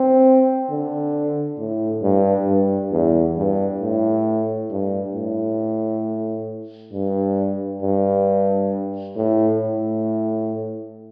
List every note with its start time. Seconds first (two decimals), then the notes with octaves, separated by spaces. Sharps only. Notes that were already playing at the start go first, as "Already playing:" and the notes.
Already playing: C4
0.70 D3
1.59 A2
2.02 G2
2.47 G2
2.92 E2
3.36 G2
3.81 A2
4.70 G2
5.14 A2
6.93 G2
7.82 G2
9.16 A2
9.60 A2